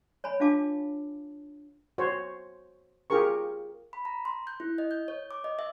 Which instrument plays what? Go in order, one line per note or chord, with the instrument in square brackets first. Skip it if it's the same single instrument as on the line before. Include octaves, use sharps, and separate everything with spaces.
[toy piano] C#5 G#5 B5
D4 F4 F5 A5 D6
[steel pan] F#4 C5 C#5
F4 G4 G#4 A#4 C#6
[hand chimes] B5
A#5
C6
G6
E4
D#5
G6
C#5
D6
D#5
E5